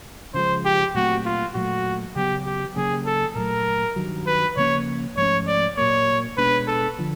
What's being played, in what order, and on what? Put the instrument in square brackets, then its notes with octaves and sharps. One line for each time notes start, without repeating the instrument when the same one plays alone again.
[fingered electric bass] C#3 F3 G#3 [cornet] C5
[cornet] G4
[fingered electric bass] A#2 F#3 A3 C4 [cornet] F#4
[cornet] F4
[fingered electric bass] A#2 F#3 A3 [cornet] F#4
[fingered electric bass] C#3 F#3 B3 [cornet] G4
[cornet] G4
[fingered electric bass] C#3 F#3 A#3 C#4 [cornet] G#4
[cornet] A4
[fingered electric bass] A#2 F#3 A3 [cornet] A#4
[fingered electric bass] G2 D#3 F#3
[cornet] B4
[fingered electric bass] C#3 F3 A#3 C#4 [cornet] C#5
[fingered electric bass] G#2 F3 A3 C#4 [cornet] C#5
[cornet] D5
[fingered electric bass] A#2 F#3 A#3 [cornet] C#5
[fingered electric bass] B2 G#3 B3 D4 [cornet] B4
[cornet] A4
[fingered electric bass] D3 F3